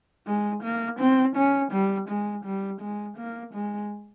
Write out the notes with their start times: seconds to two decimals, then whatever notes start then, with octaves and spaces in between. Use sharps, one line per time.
0.27 G#3
0.63 A#3
0.99 C4
1.36 C#4
1.72 G3
2.09 G#3
2.45 G3
2.81 G#3
3.17 A#3
3.54 G#3